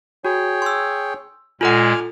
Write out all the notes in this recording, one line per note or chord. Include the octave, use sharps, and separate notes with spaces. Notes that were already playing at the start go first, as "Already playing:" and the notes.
F#4 G#4 C#5 G5
C6 E6
A#2 G#3 F4 A4 F#5 G#5 F6